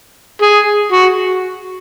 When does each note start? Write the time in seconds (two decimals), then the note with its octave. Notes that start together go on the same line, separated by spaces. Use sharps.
0.42 G#4
0.92 F#4